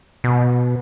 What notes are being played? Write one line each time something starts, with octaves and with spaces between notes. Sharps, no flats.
B2